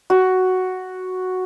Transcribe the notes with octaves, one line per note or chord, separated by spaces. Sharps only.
F#4